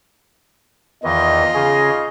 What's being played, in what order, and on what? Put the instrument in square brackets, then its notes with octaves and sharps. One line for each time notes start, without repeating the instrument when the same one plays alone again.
[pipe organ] E2 D#3 E3 [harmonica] D#4 F4 [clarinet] D#5
[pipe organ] C#3 C#4 G#4